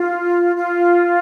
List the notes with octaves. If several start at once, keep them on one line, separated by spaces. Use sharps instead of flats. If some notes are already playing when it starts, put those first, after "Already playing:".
Already playing: F4
F4